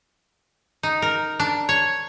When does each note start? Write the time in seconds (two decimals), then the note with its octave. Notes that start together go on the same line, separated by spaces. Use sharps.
0.83 D#4
1.02 A#4
1.40 D4
1.69 C#5